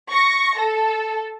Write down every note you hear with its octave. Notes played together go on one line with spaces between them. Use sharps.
C#6 A#6
A4